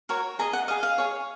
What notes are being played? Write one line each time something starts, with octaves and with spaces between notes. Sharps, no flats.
F#4 A#4 C#5
G#4 D#5 A#5
F#5
G#4 D#5 F5
F5
G#4 C#5